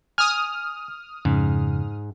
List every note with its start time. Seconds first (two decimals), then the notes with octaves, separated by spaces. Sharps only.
0.18 G#5 D#6 F6
1.25 F2 G#2 C#3